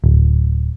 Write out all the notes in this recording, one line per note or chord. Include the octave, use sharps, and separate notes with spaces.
D1